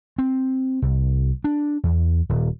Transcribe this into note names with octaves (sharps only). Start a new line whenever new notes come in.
C4
C2
D4
E2
D#1